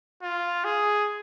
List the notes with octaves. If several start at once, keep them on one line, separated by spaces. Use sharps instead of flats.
F4
G#4